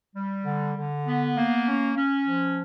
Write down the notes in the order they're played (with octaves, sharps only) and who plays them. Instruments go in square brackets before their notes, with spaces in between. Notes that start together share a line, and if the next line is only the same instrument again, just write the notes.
[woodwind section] G3
D3
D3
B3
A#3
C#4
C#4
F3